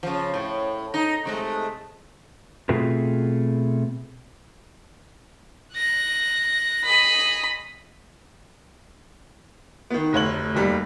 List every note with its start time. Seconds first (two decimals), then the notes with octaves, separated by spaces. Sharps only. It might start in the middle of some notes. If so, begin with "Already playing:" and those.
0.03 C#3 F3
0.34 A2
0.94 D#4
1.25 C3 G#3 A3
2.69 B2 A3 C4 F4 G#4 B4
5.75 F#6 A#6
6.85 G#4 D#5 B5
9.90 D#3 B3
10.13 F1 D2 C#5 F#7
10.55 F1 D#2 G3